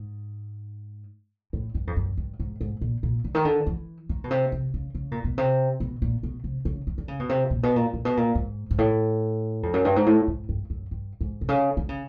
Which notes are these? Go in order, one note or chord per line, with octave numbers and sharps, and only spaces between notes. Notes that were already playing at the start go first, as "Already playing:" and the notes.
Already playing: G#2
A2
G2
F2
F#2
G2
G#2
G#2
A#2
A#2
D3
D#3
D3
E3
D#3
B2
C3
C3
C#3
C#3
A#2
B2
C3
B2
A#2
B2
C3
C#3
D#3
D3
C#3
B2
C3
A#2
B2
A#2
A#2
B2
A#2
G#2
G#2
A2
F2
F#2
G2
G#2
A2
G#2
G2
F#2
G2
G#2
C3
C#3
D3
C#3